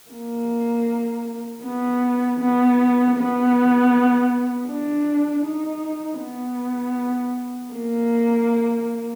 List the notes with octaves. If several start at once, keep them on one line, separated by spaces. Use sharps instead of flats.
A#3
B3
B3
B3
D4
D#4
B3
A#3